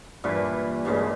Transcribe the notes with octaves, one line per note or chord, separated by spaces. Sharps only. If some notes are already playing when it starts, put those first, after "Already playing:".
G2 A#2 E3
G2 A#2 C#3 G#3